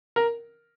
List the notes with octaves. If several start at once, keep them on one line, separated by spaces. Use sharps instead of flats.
A#4